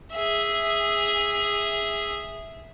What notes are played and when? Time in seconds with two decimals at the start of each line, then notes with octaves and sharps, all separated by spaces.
0.14 G#4 E5